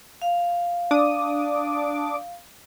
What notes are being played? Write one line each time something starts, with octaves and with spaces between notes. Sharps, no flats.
F5
D4 D6 D#6